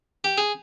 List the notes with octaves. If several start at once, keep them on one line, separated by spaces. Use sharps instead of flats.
G4
G#4